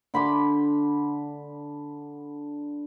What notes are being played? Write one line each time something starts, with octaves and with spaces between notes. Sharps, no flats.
D3 B5 C6 D6